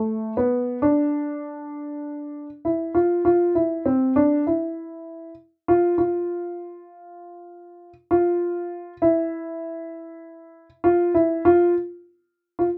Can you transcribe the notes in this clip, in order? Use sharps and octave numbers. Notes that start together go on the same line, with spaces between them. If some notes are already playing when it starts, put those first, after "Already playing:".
Already playing: A3
B3
D4
E4
F4
F4
E4
C4
D4
E4
F4
F4
F4
E4
F4
E4
F4
F4